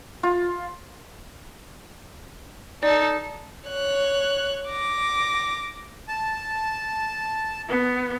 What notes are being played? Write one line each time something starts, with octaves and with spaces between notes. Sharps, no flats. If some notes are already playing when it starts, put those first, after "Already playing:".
F4
D#4 A4 D5
C#5 F#6
D6 A#6
A5
B3